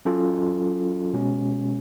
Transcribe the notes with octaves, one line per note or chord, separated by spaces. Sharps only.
F#3 C#4 F4 A4
B2 G#3 C#4